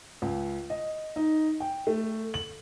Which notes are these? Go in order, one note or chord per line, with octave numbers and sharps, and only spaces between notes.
C#2
D#5
D#4
G5
A3
F#7